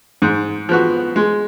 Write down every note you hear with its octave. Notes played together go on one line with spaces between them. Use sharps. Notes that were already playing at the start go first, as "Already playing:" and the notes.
G#2
F3 B3 F#4
G#3